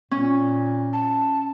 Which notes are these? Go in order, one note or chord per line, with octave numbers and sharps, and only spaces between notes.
A#2 C#4
A5